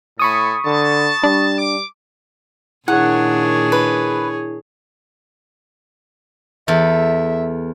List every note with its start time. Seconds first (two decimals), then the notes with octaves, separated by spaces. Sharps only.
0.19 A2 A4 G#5 B5 C#6 D#6
0.66 D3 A5
1.23 G3 D4
1.59 D6
2.88 A#2 D#3 D4 E4 G#4 C#5 F#5
3.72 B4
6.68 E2 A4 E5